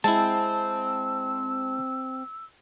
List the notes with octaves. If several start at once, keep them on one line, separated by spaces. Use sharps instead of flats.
G#3 C4 E4 A5 E6